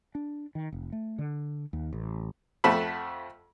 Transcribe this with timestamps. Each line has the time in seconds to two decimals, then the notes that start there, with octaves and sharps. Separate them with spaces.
0.15 D4
0.55 D#3
0.72 F1
0.92 A3
1.19 D3
1.73 D#2
1.93 A1
2.64 F2 F3 A3 F#5 A5 B5